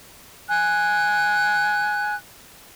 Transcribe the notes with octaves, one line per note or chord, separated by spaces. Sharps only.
G#5 F#6